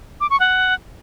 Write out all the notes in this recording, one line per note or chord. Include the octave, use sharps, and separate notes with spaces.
D6
C#6
F#5